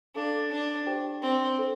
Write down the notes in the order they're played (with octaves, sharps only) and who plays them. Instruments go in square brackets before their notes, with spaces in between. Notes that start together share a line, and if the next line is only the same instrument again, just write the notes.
[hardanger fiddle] D4 [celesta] A4 F5 D6
[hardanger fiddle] D4
[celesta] G4 C5 G5 D6
[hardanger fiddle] C4
[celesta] A4 C5